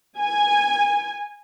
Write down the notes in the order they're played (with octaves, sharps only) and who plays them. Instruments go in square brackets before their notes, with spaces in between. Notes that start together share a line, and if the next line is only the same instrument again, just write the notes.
[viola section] G#5